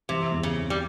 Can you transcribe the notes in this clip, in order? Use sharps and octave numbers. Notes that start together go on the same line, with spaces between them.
C3 E3
E2
C#3
C3
G3